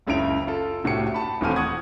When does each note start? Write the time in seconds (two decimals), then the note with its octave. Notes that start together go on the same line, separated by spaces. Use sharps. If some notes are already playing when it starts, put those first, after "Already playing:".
0.07 F#1 C#2 C#3 E4 D7 F7
0.47 F4 A4
0.84 C2 A2 F#4 G4 C#7
1.14 A5 B5
1.41 D#1 E3 A3 C4 F6 D#7
1.56 F#5 C#6 D#6 G#6